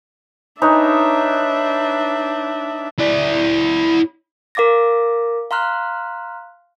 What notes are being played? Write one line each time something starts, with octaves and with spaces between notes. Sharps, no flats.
D4 D#4 B4 C#5 E5
E4 D5
A#4 F5 D6 A6 A#6
F5 A#5 C6 F6 F#6